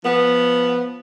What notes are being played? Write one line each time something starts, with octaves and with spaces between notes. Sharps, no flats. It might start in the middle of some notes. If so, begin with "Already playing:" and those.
F3 B3